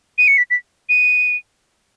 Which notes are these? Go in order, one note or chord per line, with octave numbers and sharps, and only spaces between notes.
D#7
C#7
B6
B6
D#7